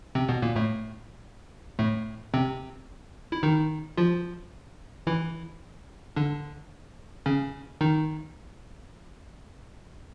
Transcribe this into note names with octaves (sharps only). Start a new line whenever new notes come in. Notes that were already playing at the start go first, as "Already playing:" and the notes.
C3 C4
B2 B3
A#2 A#3
A2 A3
A2 A3
C3 C4
E4
D#3 D#4
F3 F4
E3 E4
D3 D4
C#3 C#4
D#3 D#4